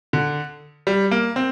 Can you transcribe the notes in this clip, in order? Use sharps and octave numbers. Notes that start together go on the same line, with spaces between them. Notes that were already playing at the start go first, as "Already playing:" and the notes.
D3
G3
A#3
C4